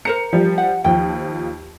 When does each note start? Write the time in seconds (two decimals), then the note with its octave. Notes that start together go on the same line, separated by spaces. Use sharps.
0.05 A#4 C5 A#5 C#7
0.33 F3 G3
0.58 F#5
0.84 D#2 F3 G5